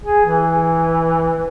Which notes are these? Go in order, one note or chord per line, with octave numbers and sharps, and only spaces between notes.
G#4
E3